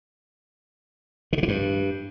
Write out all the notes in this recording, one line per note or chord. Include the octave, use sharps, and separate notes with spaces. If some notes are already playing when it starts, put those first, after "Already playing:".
D#3
D3
E3
G2